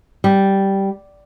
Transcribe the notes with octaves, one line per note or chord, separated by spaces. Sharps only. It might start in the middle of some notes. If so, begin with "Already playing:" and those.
G3